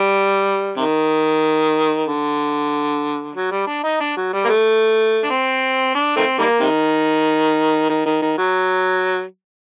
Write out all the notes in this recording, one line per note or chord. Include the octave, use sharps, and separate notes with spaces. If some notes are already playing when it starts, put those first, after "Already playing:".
Already playing: G3
C3 D#3
D3
F#3
G3
D4
D#4
D4
F#3
G3
A#3
A3
D4
C4
D4
D#3 A3 C4
D#3 G3 A#3
C3 D#3
D#3
D#3
D#3
F#3